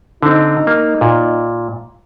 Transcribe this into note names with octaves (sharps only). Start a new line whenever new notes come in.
D3 C4 D#4
A#3
A#2